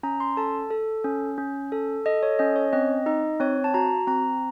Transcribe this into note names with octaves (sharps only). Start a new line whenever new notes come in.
C#4 A#5
C6
A4 A5
A4
C#4
C#4
A4
A4 D#5
C#5
C#4 D#5
C#5
C4 D#5
D#4 D#5
C4 C#5
A5
F#4 A#5
C4 A#5